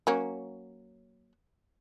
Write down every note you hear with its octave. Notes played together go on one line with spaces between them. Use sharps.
F#3 A#3 C#4